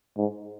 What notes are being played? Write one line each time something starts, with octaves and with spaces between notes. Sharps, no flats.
G#2